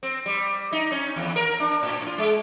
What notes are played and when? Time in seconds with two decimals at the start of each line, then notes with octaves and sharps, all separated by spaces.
0.03 C4
0.26 G3
0.72 D#4
0.92 C#4
1.16 D#2
1.36 A#4
1.60 D4
1.83 A2
2.07 F4
2.18 G#3